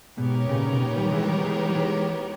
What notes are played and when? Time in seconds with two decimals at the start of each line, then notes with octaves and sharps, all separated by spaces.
0.17 G#2 B2 B3 D#4 G4 A#4 C#5
0.49 A#2 C#3
0.73 B2
0.81 A#2
0.97 D#3 G3
1.13 E3 G#3
1.28 D#3 G3
1.44 E3 G#3
1.69 G3
1.76 E3 G#3